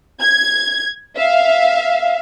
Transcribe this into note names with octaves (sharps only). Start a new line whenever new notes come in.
G#6
E5 F5